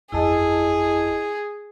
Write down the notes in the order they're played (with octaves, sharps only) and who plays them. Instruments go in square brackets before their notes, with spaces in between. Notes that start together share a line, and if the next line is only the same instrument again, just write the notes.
[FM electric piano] G1 F2 A5 [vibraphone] E4 D#5 [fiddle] G#4